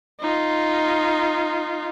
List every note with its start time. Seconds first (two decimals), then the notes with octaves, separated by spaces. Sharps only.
0.21 D#4 F4